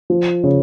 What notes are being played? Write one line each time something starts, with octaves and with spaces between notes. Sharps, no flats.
F3
C#3